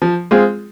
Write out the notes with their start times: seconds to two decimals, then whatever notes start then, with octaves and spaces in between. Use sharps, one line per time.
0.02 F3
0.31 G#3 C4 F4 G#4